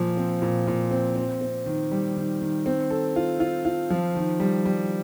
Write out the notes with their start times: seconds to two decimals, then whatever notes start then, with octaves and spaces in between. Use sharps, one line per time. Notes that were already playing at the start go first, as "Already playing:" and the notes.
Already playing: A#2 F3
0.17 C4
0.42 A#2
0.67 A#2
0.91 C4
1.16 C4
1.41 C4
1.66 D#3
1.91 G3
2.16 D#3
2.42 D#3
2.66 C4
2.90 A4
3.16 F4
3.40 F4
3.65 F4
3.90 F3
4.15 D#3
4.40 G3
4.66 G3